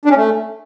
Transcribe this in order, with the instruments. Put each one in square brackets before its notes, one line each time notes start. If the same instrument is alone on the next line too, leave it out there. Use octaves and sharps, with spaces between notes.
[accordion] D4
C#4
A3